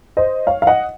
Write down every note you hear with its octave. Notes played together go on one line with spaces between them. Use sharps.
C5 D#5
C#5 F5
F5
D#5 F#5